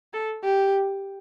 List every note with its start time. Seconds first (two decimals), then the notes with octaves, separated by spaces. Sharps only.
0.14 A4
0.44 G4